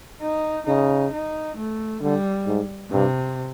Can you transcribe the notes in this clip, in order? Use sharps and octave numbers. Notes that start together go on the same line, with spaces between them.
D#4
C#3 D#4
D#4
A3
D3 G3
G#2
G2 C3